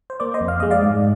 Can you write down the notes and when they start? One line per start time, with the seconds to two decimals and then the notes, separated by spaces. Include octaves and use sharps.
0.10 C5
0.20 A#3 D5
0.34 C5 D#5
0.41 F2
0.48 F5
0.60 G#3 D#5
0.71 D5 F5
0.82 G#2